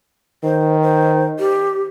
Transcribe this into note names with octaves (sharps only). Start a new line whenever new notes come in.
D#3 C5
C5
G4